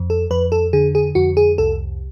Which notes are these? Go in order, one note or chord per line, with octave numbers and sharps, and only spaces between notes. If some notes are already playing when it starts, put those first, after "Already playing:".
Already playing: F2
A4
F2 B4
A4
D3 G#4
G#4
F2 F#4
G#4
C2 A4